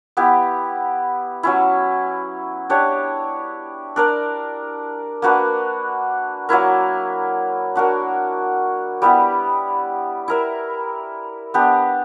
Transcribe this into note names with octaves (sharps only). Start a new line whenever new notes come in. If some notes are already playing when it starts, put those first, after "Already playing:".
B3 E4 G4
F#3 C#4 E4
D4 G4 C#5
D4 A#4 D5
A#3 D4 F#4 B4
F#3 A#3 E4 A#4
D4 F#4 A#4
G3 B3 E4 G4
E4 A#4 E5
B3 D4 G4